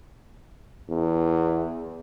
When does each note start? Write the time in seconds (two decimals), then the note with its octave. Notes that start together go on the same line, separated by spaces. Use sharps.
0.88 E2